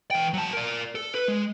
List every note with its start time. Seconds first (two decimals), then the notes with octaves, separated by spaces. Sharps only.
0.11 E3 G5
0.34 F#3 A5
0.53 A#4 D5
0.95 A4
1.15 B4
1.28 G#3